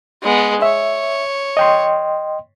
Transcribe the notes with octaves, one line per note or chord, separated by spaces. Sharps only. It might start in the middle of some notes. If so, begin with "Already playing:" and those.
G#3 B3
C#5 E5
D#5 G5 C6